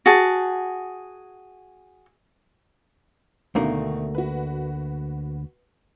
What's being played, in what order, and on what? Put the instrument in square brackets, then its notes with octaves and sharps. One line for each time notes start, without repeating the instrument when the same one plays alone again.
[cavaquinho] F#4 G#4 A5
[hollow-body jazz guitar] D2 A3 A#3 [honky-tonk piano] B2 D3 D#3
[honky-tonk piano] F#4 B4